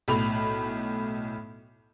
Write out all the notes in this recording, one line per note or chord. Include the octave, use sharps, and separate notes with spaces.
B1 A2 B5 F7